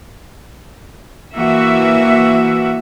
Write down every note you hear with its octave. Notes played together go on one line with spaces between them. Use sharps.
E3 A#3 F#4 E5